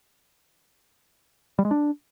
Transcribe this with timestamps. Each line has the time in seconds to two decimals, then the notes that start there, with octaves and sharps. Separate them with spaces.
1.59 G3
1.65 G#3
1.71 D4